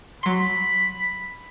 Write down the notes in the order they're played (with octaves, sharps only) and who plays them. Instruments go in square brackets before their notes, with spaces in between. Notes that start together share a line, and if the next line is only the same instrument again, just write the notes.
[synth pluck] F#3 C6 [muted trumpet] B5